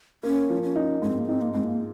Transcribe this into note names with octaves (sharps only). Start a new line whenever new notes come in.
A#3 C#4
F3
C#4
D#4
G#2 C#4
C4
A#3
C4 D#4
A#3
G#2 C4
A#3